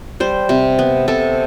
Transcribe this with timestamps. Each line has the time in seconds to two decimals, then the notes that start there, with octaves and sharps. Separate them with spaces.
0.20 G3 C5
0.49 C3
0.79 B3
1.08 C3 A4